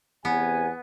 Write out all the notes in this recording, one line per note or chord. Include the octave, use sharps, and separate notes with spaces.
E2 C3 B3 G#5